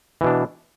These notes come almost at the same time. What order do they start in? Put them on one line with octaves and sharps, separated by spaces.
E3 B2 D4